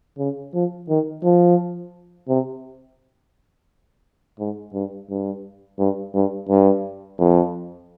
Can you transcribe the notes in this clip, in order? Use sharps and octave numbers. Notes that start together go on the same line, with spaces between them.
C#3
F3
D#3
F3
C3
G#2
G2
G2
G2
G2
G2
F2